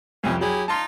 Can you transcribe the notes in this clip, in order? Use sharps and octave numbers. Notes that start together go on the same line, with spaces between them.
C2 F2 C4 C#4
F#3 E4 G4 G#4
D#4 F4 A5 C6